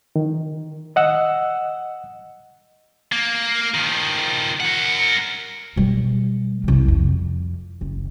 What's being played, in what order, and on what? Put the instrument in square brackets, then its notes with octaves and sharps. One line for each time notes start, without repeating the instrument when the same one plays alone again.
[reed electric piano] D#3
D#5 F#5 E6
[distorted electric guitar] A#3
D#3 F3
A#4 F#5
[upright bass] B2 G3
C2 G3
F2
F#1